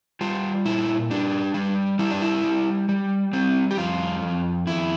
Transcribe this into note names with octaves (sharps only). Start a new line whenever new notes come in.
G3 F4
A#2 E4
G3 D4
G3
G3 E4
D4
E4
G3
G3
G3 C4
G4
F2 F4
F2
F2 E4